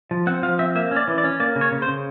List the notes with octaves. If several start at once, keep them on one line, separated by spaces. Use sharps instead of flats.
F3
C4 F#5
F3 F5
C4 E5
A#3 E5
C#4
D5
E3
D5
C#4
A#3 D5
C#3
C#5
C#3
C5
C#3